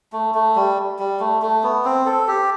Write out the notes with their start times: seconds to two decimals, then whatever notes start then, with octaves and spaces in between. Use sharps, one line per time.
0.13 A3
0.35 A3
0.55 G3
0.99 G3
1.20 A3
1.42 A3
1.63 B3
1.85 C4
2.06 A4
2.28 G4